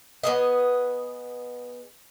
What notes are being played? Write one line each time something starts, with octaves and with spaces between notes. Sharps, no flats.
B3 G#4 D#5